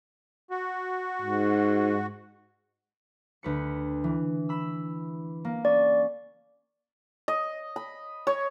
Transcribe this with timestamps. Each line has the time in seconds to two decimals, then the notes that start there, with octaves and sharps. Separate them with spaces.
0.51 F#4
1.22 G#2
3.43 D2 B4 C#7
4.04 E3
4.49 B5 E6
5.45 A#3
5.65 C#4 D5
7.28 D#5
7.76 B5
8.27 C#5